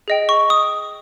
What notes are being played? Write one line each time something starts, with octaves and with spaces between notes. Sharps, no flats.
G#4 D#5 G5
C#6
D#6